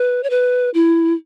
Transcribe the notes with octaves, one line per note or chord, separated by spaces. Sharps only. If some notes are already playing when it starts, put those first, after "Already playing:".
Already playing: B4
C#5
B4
E4